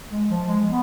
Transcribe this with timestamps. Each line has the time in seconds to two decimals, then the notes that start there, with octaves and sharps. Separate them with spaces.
0.11 G#3
0.29 F3
0.47 G#3
0.65 B3